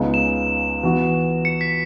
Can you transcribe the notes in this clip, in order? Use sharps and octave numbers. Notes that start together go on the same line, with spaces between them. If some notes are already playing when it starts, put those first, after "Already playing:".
Already playing: C#2 C#3 G#3 B3 D#4
E7
E3 B3 F#4
C#7
B6